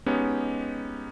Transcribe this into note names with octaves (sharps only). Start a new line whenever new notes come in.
G#3 B3 C#4 D#4 G4